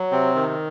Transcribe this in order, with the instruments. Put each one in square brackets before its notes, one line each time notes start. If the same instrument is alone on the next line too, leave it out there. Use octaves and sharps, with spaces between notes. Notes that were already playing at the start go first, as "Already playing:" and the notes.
Already playing: [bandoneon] F#3
C3 C4
D#3